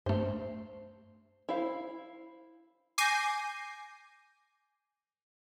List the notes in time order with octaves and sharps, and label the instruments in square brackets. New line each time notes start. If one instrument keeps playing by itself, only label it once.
[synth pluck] G2 A3 [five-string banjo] C5
[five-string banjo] E4 C5 F5
[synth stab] G#5 D6 G6 A#6 C7 D#7